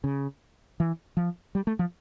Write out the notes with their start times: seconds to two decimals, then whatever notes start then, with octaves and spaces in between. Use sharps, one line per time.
0.04 C#3
0.80 E3
1.17 F3
1.55 G3
1.67 A3
1.79 F3